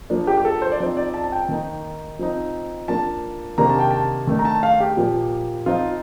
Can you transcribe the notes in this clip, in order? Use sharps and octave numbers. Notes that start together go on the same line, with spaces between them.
F3 A#3 D4
G4
G4
A4
C5
D5
F3 C4 D#4 C5
D5
A5
A5
G5
D#3 A#3 D#4
F3 C4 D#4
F3 A#3 D4 A5
C3 D#3 A#3 D4 A#5
A5
G5
A5
D#3 A3 D4
A#5
A5
F5
G4
A#2 F3 A#3
F3 C4 D#4 F4